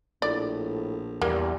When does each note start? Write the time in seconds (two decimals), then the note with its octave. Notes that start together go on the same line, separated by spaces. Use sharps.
0.22 A#1 A2 D5
1.22 E2 G3 A#3